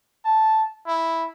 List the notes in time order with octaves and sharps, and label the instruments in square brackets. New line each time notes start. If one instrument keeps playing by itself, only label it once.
[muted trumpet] A5
E4